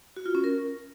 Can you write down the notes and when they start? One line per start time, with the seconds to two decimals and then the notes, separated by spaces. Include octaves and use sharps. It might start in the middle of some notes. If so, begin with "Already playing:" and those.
0.16 F#4
0.26 F4
0.35 C#4
0.44 A#4